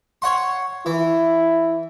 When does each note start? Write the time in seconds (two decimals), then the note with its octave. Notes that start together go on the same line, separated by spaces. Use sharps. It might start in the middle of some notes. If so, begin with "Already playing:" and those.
0.22 C#5 F#5 C6
0.86 E3 E4